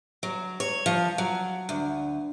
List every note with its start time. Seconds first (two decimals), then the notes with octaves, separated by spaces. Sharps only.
0.23 F#3
0.60 C#5
0.86 F3
1.18 F#3
1.69 D2